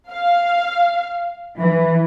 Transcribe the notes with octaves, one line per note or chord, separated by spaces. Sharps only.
F5
E3